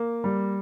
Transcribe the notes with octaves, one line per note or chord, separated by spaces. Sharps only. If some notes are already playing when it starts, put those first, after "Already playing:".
Already playing: A#3
G3